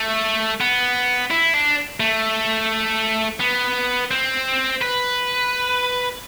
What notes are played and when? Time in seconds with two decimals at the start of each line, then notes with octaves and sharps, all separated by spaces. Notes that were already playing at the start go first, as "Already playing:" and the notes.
Already playing: A3
0.61 B3
1.30 E4
1.54 D4
2.00 A3
3.40 B3
4.11 C4
4.81 B4